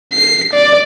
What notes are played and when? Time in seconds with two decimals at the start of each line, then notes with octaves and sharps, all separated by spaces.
0.13 C7
0.53 D5